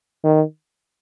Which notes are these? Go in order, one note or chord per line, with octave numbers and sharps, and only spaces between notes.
D#3